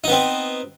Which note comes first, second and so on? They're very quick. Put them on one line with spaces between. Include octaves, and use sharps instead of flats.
D#4 B3 C4